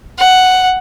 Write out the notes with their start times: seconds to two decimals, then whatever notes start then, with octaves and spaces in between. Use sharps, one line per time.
0.18 F#5